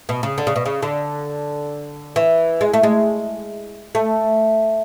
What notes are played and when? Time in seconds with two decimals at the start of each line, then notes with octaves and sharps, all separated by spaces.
0.09 B2
0.23 C#3
0.38 D3
0.47 C#3
0.56 B2
0.66 C#3
0.82 D3
2.16 E3
2.61 G#3
2.73 A3
2.83 G#3
3.95 A3